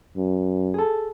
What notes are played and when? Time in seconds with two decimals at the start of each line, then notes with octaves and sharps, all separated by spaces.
0.17 F#2
0.74 G#4 A4